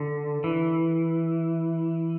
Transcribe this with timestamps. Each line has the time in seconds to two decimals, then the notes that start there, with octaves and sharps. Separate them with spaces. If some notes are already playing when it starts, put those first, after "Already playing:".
Already playing: D3
0.44 E3